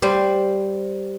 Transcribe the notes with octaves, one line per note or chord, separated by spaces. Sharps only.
G3 C4